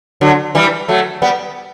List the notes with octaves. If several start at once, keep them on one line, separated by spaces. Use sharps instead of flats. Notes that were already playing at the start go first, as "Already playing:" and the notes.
D3 F#3
E3 G3
F#3 A3
G3 B3